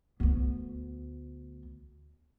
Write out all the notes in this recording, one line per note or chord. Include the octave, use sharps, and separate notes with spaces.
D2 B3